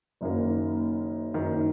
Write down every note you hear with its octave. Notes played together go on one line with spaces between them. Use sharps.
F#1 F#2 D#3 A#3
F#1 F#2 D#3